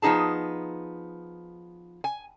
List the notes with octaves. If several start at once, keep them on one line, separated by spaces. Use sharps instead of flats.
F3 B3 D#4 G#4 A5
G#5